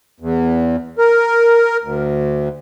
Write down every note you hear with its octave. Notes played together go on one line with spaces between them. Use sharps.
E2
A#4
D2